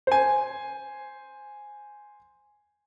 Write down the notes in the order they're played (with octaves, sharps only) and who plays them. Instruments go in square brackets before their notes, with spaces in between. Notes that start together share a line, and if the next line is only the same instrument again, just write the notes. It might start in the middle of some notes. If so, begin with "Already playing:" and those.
[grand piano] C5 G#5